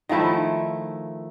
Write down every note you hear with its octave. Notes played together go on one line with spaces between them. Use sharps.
D#3 F3 A3 E4